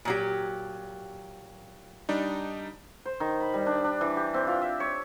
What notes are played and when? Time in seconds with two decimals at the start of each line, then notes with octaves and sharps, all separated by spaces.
0.05 A#2 F#3 G4
2.09 G3 D4 D#4
3.05 C5
3.20 D#3
3.40 B5
3.54 G3
3.66 D4
3.84 D4
4.01 E3
4.17 G4
4.34 C4
4.47 F4
4.61 E5
4.80 C#5